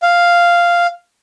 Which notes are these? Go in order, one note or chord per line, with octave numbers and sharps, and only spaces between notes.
F5